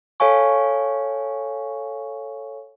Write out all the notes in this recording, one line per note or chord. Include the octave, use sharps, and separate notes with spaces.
A4 C#5 F5 G#5 C#6